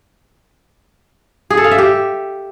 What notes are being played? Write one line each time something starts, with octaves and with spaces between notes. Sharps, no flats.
G#4
A4
F5
E5
G4